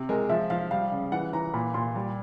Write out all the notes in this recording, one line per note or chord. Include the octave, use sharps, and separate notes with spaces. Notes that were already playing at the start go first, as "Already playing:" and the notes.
Already playing: C3
G#3 A#4
F3 E5
F3 F5
G3 F5
C#3
E3 F#5
E3 A#5
A#2 B5
A#2 C6
G3